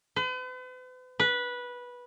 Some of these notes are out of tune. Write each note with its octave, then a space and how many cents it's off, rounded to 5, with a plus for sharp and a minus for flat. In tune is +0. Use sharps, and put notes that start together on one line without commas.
B4 +45
B4 -15